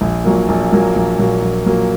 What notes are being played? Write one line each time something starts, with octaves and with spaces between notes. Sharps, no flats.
A#1
A#2 F#3 A#3
A#1
A#2 F#3 A#3
A#1
A#2 F#3 A#3
A#1
A#2 F#3 A#3